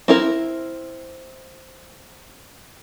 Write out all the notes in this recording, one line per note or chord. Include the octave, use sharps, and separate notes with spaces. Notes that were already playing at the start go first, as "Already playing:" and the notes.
C4 E4 A#4